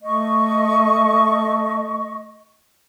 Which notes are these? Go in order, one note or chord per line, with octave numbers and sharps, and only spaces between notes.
A3 D#5 C#6